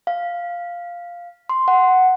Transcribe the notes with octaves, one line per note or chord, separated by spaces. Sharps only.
F5
C6
F#5